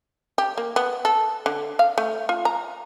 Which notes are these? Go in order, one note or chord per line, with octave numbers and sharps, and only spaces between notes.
G4
A#3
B3
A4
D3
F5
A3
F4
A#5